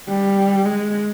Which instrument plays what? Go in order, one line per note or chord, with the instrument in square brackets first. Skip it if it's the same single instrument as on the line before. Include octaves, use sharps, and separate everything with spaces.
[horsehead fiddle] G3
G#3